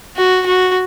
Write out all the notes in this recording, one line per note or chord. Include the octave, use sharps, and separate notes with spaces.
F#4
F#4